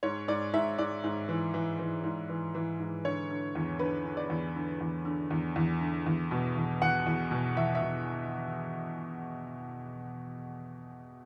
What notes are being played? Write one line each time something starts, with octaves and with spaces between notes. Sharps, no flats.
G#2 C#5
G#2 D5
G#2 E5
G#2 D5
G#2
E3
E3
E3
G#2
E3
E3
G#2
D3 C#5
D3
E2
D3 B4
D3
D5
E2
D3
E2
D3
E2
E2
D3
E2
B2
E2
E2 F#5
E2
B2
E2 E5
E5
B2